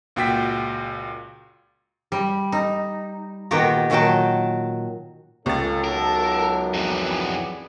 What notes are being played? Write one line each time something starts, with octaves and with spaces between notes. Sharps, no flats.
C#2 A#2 F#4 G5 A6 B6
G3
D#4
A#2 D#3 B3 F#4 G4 A#5
A#2 D#3 F#3 F#4 G5 A5
C#2 C#4 F4 A4 A6
B1 F#2 F#3 A4 A#4 A5
F2 E3 B3 G#4 D5